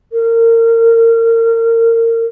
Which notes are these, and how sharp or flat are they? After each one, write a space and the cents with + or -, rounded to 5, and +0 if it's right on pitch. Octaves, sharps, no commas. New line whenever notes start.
A#4 -25